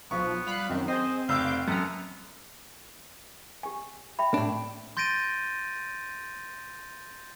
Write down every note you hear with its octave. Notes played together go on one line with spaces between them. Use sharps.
B1 F3 B3 C#6
G3 F5 B5 F#6
F#2 D#3 C4
C4 G#4 C5 D#5
F1 F5 D6 E6 G6
F#2 B3 A4 A#5
G4 G#5
E5 G5 B5
A2 D4
C6 G6 A6 A#6 D7 D#7